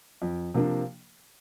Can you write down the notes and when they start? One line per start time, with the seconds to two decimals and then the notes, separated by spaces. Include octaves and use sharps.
0.22 F2
0.54 C3 F3 A#3 D4